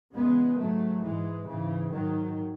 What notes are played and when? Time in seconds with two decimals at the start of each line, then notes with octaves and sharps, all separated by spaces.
0.15 E2 C#3 G#3 B3
0.59 G#2 F#3 A3
1.03 G#2 E3 G#3
1.48 G#2 C#3 E3
1.92 G#2 D#3 F#3